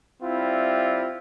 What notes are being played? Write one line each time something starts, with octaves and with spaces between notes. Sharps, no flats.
G3 C4 E4 F4 E5